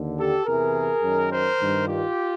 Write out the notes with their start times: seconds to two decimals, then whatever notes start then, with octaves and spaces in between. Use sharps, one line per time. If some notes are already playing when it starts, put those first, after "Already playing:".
Already playing: D#2 D3
0.18 G4 A4
0.46 E2 C3 E3 G#4 A#4
1.03 F#2 D#3
1.30 A#4 C5
1.59 G2 D#3
1.87 F4 G4